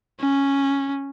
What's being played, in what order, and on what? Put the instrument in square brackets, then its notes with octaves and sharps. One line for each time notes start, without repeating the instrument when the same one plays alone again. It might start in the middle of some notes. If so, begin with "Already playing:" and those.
[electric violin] C#4